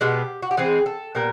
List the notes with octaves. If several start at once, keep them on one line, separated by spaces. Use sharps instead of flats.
B2 G#3 B3 G4
F#4
G4
E3 G#3 C4 G#4
A4
A#2 G3 B3 A#4